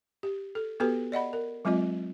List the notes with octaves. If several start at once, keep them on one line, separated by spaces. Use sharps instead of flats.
G4
A4
B3 F#4 G4 A4 B4
D5 D#5 F#5 B5
A#4
F#3 G#3 C4 F4 D#5